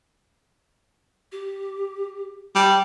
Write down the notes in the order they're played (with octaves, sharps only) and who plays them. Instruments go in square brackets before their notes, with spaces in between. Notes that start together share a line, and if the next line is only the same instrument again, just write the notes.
[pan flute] G4
[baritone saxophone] G3 [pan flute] A5